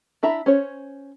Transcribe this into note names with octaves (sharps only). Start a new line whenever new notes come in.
D4 E4 E5 A#5
C#4 C5 C#5